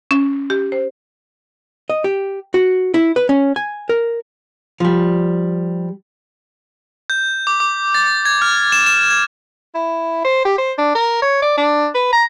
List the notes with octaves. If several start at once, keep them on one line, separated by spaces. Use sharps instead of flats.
C#4
G4
C5
D#5
G4
F#4
E4
B4
C#4
G#5
A#4
F3 G3
G6
D6
D6
A6
G#6
F6
E7
E7
G#6
E4
C5
G4
C5
D4
A#4
C#5
D5
D4
B4
A#5